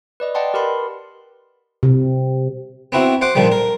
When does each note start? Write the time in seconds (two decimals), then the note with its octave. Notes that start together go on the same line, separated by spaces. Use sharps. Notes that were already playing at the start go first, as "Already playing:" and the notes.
0.20 B4 D5 D#5
0.35 D5 D#5 F#5 G5 A5 C6
0.54 G4 A#4 B4 B5 C6
1.83 C3
2.92 B3 C4 E4 F#4
3.21 C5 F#5 D6
3.35 A#1 A#2 D#3 F3 G3
3.52 A#4